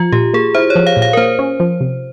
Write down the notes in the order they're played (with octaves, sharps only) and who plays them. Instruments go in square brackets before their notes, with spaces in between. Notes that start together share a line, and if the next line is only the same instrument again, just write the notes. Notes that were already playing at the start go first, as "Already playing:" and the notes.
Already playing: [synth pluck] F3 [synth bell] F4
[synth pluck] A#2 [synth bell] G4
[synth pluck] A#3 [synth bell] G#4
[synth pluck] E4 [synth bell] C5
[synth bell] C#5
[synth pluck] F3
[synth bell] F5
[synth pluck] A#2
[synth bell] F5
A#4
[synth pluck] A#3 [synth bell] C5
[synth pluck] C#4
F3
C3